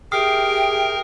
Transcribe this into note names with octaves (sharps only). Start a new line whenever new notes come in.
G4 G#4 A#4 E5 G5 D#6 F6 C7